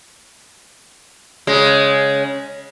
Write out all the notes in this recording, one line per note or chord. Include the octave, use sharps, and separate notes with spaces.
C#3 G#3